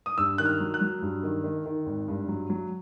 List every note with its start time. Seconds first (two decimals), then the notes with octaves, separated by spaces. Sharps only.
0.06 D#6
0.18 G2 E6
0.38 D#3 F#6
0.46 F6
0.60 F#3
0.74 F#6
0.81 F#3
1.02 G2
1.23 D#3
1.44 D#3
1.66 D#3
1.86 G#1
2.08 G2
2.28 F#3
2.50 F#3